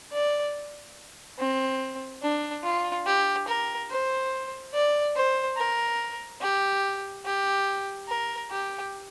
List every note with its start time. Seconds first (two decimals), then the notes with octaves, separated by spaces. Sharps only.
0.13 D5
1.39 C4
2.23 D4
2.64 F4
3.07 G4
3.48 A#4
3.91 C5
4.74 D5
5.16 C5
5.57 A#4
6.41 G4
7.25 G4
8.08 A#4
8.51 G4